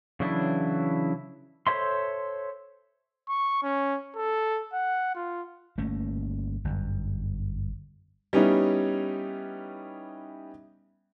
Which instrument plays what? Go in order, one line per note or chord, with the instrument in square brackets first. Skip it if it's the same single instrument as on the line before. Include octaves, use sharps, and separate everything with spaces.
[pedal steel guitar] C#3 E3 F#3 D4 E4
A4 C5 C#5 E5 C6
[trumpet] C#6
C#4
A4
F#5
F4
[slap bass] G1 A3 A#3 C#4
G1 F#2
[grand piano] G3 B3 C#4 D#4 E4